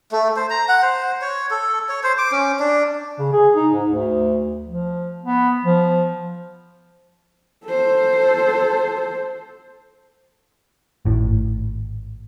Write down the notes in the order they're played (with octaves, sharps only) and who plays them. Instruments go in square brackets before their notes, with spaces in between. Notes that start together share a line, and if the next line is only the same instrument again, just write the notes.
[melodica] A3
C5
A#5
F#5
C5
C#5
A4
C#5
C5
D6
C#4
D4
[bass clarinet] C#3
G#4
D#4
G#2
D2
F3
B3
F3
[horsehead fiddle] A4 C5
[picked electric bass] G#1 A2